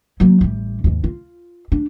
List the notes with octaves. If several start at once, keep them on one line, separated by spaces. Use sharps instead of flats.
F#3 A#3
A1 G3
D#2 G#2
F4
D4